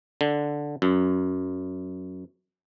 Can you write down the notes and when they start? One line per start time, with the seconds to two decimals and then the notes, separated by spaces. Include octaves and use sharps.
0.21 D3
0.82 F#2